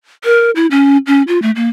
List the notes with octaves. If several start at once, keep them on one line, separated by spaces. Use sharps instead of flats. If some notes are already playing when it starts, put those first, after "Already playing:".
A#4
E4
C#4
C#4
F4
A3
A#3